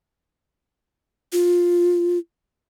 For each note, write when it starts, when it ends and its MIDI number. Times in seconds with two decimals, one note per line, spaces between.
1.33 2.18 65